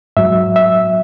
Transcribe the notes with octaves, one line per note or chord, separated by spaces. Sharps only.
G#2 F#3 E5
E5